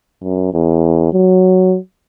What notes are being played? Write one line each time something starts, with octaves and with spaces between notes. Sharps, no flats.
F#2
E2
F#3